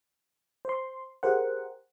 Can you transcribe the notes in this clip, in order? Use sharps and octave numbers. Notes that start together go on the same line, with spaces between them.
C5 C6
G4 G#4 A#4 C5 F#5